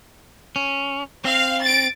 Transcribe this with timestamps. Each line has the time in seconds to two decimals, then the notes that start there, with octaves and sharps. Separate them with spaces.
0.56 C#4
1.25 C4 F5
1.62 A6 D7